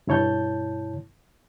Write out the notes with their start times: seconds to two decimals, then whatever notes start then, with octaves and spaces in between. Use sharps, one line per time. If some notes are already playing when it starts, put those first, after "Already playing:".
0.07 G2 B2 E4 C#5 A5 G6